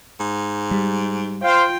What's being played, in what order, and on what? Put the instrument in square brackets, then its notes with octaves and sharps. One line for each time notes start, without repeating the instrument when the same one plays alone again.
[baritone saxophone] G#2
[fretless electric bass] G3
[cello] F4 G5 [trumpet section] C5 F5